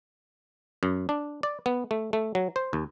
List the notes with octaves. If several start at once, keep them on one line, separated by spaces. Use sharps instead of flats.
F#2
D4
D5
B3
A3
A3
F#3
C5
D#2